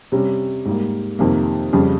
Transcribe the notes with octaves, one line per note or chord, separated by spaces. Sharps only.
C3 G3 C#4
G#2 G3 A#3
F2 C3 D#3 A#3
F2 C#3 G3